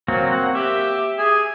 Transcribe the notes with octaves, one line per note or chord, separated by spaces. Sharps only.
F#3 A#3 C4 F#4
F#5
G4 E5
G#4